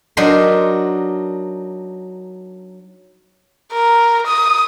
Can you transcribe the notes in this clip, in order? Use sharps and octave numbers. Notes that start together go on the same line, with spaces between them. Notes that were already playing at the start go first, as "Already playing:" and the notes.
F#3 D4 D#4 A#4 B4 C6
A#4
D#6